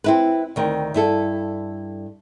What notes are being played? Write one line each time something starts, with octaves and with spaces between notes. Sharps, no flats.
C4 E4 B4
D2 D#3 C4
G2 E4 A4